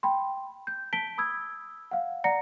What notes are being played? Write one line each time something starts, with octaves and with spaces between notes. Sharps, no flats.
G5 B5 C6
G6
A5 B6 D7 G7
B5 D#6 E6 G#6
F5 F#5
D5 F#5 A#5 A#6 C#7